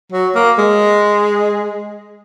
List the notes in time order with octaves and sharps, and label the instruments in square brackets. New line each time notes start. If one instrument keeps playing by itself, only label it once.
[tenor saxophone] F#3
A#3
G#3